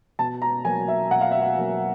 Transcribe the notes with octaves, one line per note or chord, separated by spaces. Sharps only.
B2 A5
A#5
F#3 A#3 G#5
E5
B2 F#5
F5
E5
F5
F#3 A#3